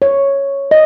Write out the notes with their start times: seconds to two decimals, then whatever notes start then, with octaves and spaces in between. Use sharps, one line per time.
0.02 C#5
0.71 D#5